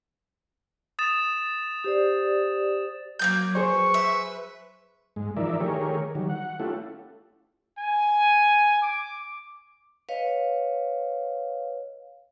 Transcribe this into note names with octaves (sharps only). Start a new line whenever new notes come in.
D#6 A6 E7
G4 C5 D5
F#3 A#3 B3 G6
G#4 B4 C5 C#6
E5
G#2 G#3
E3 F3 D#4 A#4 D5 E5
D#3 A3 G4 G#4 A#4 C#5
D#3 F#3 G3
F#5
A3 C#4 E4 F4 G4 A4
G#5
D6
B4 C#5 D#5 F5